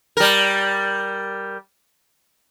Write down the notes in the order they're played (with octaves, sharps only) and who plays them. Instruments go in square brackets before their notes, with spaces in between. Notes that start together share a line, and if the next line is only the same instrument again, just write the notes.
[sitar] G3 A#4